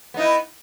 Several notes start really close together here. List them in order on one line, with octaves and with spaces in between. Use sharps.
B3 D#4 E4